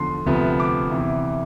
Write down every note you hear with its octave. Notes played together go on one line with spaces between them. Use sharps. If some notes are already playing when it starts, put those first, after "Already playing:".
Already playing: E2 D3 F3 C6
D2 C3 F3 B3
D6
E2 C3 E3